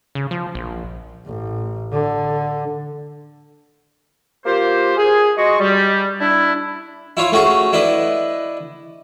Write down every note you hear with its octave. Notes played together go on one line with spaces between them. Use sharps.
C#3
F3
A#1
A1
D3
A#3 F4 G4 C5
G#4
G#3 F#4 D#5 C6 C#6
G3
D4 E4
E4 F4 C#5
A3 C#4 F#4 G#4
D4 E4 B4 D#5